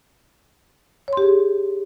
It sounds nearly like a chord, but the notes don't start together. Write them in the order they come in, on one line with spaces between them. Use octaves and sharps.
C#5 C6 G4 G#4